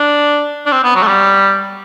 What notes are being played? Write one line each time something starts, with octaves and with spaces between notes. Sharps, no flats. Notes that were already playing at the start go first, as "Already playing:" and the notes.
Already playing: D4
D4
C4
B3
F#3
A3
G3